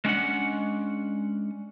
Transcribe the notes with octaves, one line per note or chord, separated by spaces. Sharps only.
G#3 C#4 D4 F#5